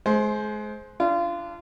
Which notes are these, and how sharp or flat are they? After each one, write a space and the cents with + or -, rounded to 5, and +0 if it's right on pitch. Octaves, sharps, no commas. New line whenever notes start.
G#3 +35 C5 +0
D4 +0 F4 -25